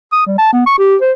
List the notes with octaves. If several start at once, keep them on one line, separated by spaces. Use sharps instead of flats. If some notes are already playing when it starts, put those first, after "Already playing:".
D#6
G3
A5
B3
C#6
G4
C5